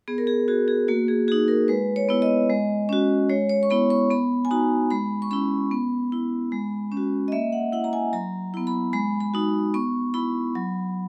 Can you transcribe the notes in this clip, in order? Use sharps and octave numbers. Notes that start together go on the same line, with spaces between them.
B3 G#4
A#4
G#4
F#4 G#4
G#4
A#3 F#4
G#4
D#4 F#4 G#4
A#4
G#3 B4
C#5
B3 E4
D#5
G#3
C#4 F#4
G#3 C#5
C#5
C#6
B3 E4 B5
C#6
B3 B5
G#5
D#4 F#4 A#5
G#3 B5
C#6
C#4 E4 B5
B3
E4
G#3
C#4
F#4
D#5
A#3 E5
F#5
E4 F#5
A#5
G#5
F#3 A#5
B3 E4
B5
G#3 B5
B5
D#4 F#4
B3 C#6
E4 B5
F#3